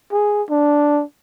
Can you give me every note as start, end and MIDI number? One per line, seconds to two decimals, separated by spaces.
0.12 0.43 68
0.50 1.03 62